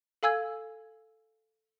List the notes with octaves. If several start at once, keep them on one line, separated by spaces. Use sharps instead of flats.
A4 F5 G#5 E6 G#6